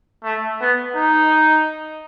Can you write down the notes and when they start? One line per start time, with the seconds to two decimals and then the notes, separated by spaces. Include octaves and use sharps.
0.23 A3
0.61 B3
0.96 D#4